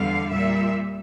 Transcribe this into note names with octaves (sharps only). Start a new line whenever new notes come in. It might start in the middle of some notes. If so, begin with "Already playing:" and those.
Already playing: E2 D3 G3 F5
A#2 G3 E5